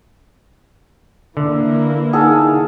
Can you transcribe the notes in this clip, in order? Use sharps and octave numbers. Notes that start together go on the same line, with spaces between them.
D3 E3 A#3 E4
D#4 G#4 A4 F5 F#5